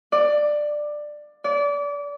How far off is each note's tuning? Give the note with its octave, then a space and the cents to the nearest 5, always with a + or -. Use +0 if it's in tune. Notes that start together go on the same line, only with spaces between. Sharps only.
D5 +15
D5 -30